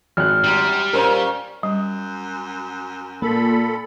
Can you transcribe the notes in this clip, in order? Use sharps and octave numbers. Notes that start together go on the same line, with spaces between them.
G#1 F6 F#6
F#2 G3
A#2 C#4 A#4 C5
F#2 G3
A#2 A#3 A4 B5